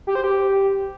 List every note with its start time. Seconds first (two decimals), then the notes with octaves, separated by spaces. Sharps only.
0.07 G4
0.15 C5
0.24 G4